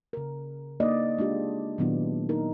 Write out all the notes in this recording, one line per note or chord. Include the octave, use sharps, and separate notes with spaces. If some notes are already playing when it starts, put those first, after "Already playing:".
C#3 A#4
A#3 D4 D#4 D5 D#5
G#3 D4 F4 G4
A#2 D#3 F#3 B3 D4 E4
D#4 A#4